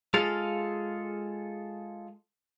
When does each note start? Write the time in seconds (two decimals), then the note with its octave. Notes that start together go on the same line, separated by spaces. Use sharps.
0.14 G#3 F4 G#4 A4 F5